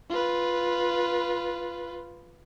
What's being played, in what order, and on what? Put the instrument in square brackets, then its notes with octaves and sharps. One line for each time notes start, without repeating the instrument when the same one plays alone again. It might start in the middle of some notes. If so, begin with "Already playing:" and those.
[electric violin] F4 B4